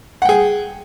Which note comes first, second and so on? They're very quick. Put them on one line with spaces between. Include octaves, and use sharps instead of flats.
F#5 G5 G#4